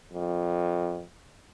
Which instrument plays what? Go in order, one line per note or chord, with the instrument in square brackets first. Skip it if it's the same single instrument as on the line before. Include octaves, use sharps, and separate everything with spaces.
[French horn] F2